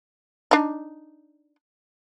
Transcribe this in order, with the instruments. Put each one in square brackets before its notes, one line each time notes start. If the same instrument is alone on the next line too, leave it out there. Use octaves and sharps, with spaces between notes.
[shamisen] D4 D#4